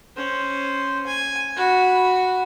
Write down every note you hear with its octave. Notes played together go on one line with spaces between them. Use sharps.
C#4 C5
G#5
F#4 B5